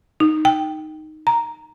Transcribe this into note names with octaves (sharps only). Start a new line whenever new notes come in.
D#4
G5
A#5